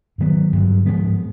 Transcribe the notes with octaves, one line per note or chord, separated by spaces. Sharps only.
G#2 D#3 F#3 B3
G2 D3 F#3
G#2 F3 G#3 B3